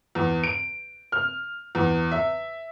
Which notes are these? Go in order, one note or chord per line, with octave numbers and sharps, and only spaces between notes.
E2
D7
F6
E2
E5